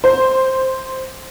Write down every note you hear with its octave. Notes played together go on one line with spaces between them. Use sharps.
C5